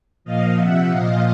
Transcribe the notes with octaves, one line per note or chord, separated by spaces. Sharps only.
A#2 F3 D#5 F5
C3 F3 E5 F#5
A#2 F3 D#5 F5